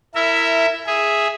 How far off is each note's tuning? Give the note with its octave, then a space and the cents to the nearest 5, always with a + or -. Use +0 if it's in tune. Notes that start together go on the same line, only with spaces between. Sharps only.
E4 +5 A#4 -25 E5 +0
G#4 +0 E5 +0